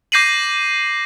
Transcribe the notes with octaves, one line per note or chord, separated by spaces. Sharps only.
D6 G6 A#6 C7 D#7 F#7